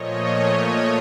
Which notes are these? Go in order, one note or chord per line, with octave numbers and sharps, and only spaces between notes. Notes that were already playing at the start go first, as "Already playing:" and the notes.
Already playing: A#2 F3 A3 C#5 D#5